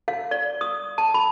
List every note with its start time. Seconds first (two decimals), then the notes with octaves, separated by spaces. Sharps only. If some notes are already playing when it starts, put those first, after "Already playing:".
0.08 F5
0.31 D5
0.61 D#6
0.98 A5
1.14 B5